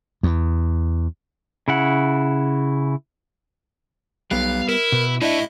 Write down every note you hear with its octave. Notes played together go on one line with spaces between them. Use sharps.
E2
C#3 E4 F#5
B1 G3 B3 F5 F#6
E4 A#4
B2 B4
A2 D4 E4 D#5 E5